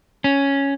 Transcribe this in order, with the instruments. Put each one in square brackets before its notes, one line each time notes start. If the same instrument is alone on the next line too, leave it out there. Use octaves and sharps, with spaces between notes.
[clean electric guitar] C#4